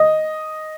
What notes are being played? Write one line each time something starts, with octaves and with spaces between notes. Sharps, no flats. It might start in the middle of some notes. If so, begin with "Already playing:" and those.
Already playing: D#5